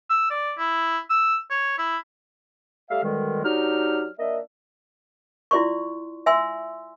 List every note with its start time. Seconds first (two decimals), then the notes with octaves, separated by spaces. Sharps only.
0.10 E6
0.30 D5
0.58 E4
1.10 E6
1.50 C#5
1.78 E4
2.90 G3 A3 E5 F5
3.04 B2 D3 D#3 G3 G#3
3.45 F#3 D4 D#4 F#4 G4 F6
4.19 A#3 D4 D#5 E5
5.51 E4 F4 D5 C6 C#6
6.26 E5 G#5 C6 E6